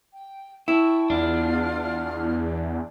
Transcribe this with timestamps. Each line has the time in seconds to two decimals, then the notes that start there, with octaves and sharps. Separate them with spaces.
0.14 G5
0.68 E4 G5 A5 C#6
1.10 E2 D4 F4 F#5 F6